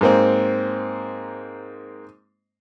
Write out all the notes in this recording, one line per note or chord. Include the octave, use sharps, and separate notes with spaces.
G#2 A#3 C4